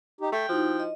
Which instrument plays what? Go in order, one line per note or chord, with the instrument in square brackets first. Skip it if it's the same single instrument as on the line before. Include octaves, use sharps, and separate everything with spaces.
[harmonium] D#4 G4
[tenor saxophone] A3 [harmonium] G5
[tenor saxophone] F3 [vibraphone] D#4 E4 F#4
[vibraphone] D#5